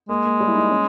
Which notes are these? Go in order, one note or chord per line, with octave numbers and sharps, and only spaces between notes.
G#3 A#3
A#3
G3
E4
D#4
C#4